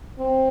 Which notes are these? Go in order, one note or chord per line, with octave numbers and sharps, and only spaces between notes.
C4